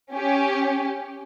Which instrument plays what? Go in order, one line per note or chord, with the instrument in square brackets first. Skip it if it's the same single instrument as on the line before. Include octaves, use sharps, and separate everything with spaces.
[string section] C#4 G4